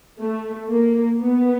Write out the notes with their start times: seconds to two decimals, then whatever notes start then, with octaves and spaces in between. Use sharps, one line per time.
0.20 A3
0.70 A#3
1.19 B3